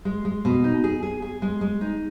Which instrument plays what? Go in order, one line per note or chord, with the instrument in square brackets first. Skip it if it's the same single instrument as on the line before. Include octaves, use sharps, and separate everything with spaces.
[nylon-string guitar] G#3
G#3
B2
D#4
G#4
G#4
G#4
G#3
G#3
D#4